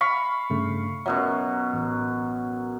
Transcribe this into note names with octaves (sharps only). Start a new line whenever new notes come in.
F5 B5 C#6
G2 C#3 A3
F#2 B2 F#3 E5
A1